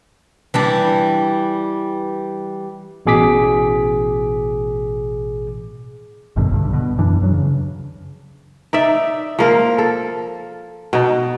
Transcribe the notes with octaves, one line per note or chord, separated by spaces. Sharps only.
E3 G3 D4
A1 B2 G#4 D6 B6
G1 F#2 B2 D3
B1 G2 D3
B2
F#2 E3 D4
F#2 F#3
C#3
D#4 D5 E5
F3 A#3 A#4
A4
B2 D#4